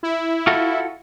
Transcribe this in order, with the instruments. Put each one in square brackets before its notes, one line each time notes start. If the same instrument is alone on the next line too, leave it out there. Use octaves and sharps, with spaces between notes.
[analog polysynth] E4
[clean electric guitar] F4 F#4 A4